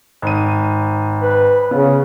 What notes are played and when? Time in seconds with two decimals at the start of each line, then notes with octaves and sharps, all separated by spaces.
0.22 G#1 D#7
1.22 B4
1.71 C#3 B3 C#4 F4